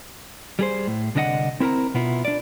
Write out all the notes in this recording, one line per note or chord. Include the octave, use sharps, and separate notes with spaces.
G3 G#4 C5
A2
C2 D3 D4 F4 D#5 F#5
C4 E4 A#4 C5 A#5
B2 B3 E4 F4
D4 D5